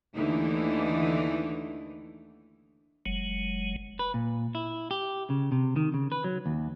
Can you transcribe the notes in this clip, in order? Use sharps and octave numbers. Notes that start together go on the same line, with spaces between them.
D#2 D3 E3 A3 D#4
F#1 F#3 G#3
B4
A#2
E4
G4
C#3
C3
D#3
C#3
B4
F#3
D#2